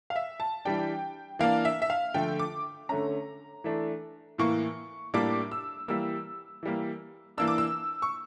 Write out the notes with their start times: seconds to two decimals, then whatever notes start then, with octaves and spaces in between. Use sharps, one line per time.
0.10 F5
0.16 E5
0.40 A5
0.65 E3 G3 D4 G5
1.39 E3 A#3 D4 F5
1.65 E5
1.82 E5
1.90 F5
2.14 D3 F3 A3 G5
2.39 D6
2.89 D3 A3 C#4 A#5
3.64 E3 A3 D4
4.38 A2 E3 A#3 C#6
5.14 A2 G3 A#3 D4 D6
5.52 E6
5.88 E3 G3 A#3 E6
6.63 E3 G3 A#3
7.37 E3 A#3 D4 E6
7.48 D6
7.58 E6
8.02 C#6